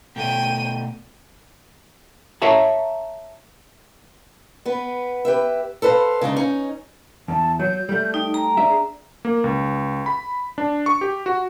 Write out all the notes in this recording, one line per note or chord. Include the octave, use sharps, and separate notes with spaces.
B2 A3 G5 D#7
C#5 E5 A5 A#5
B3 B4
G4 B4 E5
A4 B4 C5 E5 F5
C#3 G#3 D4 D#4
C#4 D#4
E2 A5
F#3 G6
G3 A3
D#4 G5
A#5
D4 G#4 E5
A#3
C#2
B5
D4
C#6
G4
F#4